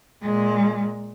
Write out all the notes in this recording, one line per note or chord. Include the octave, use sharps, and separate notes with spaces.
A#2 G#3